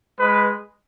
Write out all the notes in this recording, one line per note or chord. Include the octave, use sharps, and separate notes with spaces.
G#3 B4